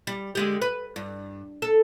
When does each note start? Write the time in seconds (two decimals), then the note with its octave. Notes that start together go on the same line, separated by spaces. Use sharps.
0.07 G3
0.35 D3 G#3 G4
0.62 B4
0.96 G2
1.62 A4